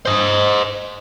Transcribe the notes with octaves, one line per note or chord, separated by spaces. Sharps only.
C5 D#5